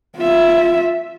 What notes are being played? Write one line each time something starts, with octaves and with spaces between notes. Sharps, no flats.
F4 E5